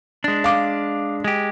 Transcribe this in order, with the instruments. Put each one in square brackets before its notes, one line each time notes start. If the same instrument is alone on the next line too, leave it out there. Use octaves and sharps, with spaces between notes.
[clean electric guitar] G#3 D4
[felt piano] F5 D6
[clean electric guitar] G#3 G4